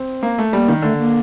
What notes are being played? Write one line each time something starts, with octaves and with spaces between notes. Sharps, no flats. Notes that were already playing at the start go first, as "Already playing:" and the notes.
Already playing: C4
A#3
A3
G3 A#3
D#3
D3 A3
A#3